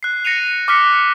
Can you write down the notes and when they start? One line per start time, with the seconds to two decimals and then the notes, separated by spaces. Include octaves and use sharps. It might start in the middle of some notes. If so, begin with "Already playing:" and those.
0.03 F#6 C7
0.25 A#6 C#7 D#7 F7
0.68 D6 F6 F#6 B6 C#7